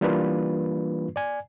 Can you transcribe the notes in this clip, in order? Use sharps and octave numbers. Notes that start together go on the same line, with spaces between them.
E3 G3 A#3 D4 F4 B4
D5 G#5